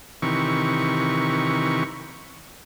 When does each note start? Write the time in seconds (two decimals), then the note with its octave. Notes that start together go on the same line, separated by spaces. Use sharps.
0.22 C3 D#3 E3 C#6